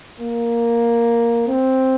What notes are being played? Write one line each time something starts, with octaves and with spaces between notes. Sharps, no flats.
A#3
C4